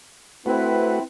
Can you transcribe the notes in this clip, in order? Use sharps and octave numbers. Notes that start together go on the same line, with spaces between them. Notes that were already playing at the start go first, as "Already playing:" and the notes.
A3 C4 E4 F#4 B4